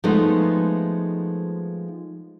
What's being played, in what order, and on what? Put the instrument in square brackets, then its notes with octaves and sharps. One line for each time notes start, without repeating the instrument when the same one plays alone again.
[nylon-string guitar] F3 G#3 A3 B3 D#4